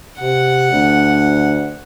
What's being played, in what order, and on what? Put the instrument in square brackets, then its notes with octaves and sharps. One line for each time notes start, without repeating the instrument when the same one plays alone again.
[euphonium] C3 [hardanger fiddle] F#5
[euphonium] D2